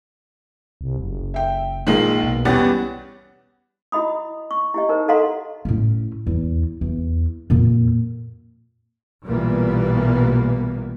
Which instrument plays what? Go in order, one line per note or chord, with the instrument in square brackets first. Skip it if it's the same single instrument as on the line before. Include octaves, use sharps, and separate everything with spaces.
[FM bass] C2
F#1
[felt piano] E5 G5
[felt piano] A#1 A#3 [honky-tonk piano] D#3 G#3
[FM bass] B1
[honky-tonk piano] E2 F#5 A6 [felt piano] G3 B3 C#4
[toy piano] E4 F#4 D#5 B5 D#6
C#6
E4 G4 D#5
D#4 A#4 C5
A4 D#5 F5 F#5 A#5 C6
[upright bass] A2 C#4
E2
E2
F2 A#2
[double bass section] B1 A#2 E3 G3 A#3 B3